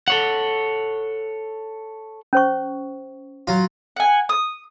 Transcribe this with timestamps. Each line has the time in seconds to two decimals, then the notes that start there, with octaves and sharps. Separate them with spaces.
0.08 A4 C#5 F#5
2.33 C#4 C5 C#6
3.47 F#3 F4
3.96 F#5 G#5
4.29 D#6